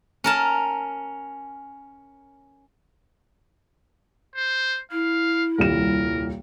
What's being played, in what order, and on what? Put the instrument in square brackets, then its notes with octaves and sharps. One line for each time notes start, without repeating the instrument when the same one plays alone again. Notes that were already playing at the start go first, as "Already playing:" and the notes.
[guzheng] C#4 A#4 A5
[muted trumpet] C5
[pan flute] E4 [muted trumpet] F5
[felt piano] D#1 C2 E7 [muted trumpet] A#4